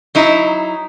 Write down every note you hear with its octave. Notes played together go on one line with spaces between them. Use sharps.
F#3 D#4 E4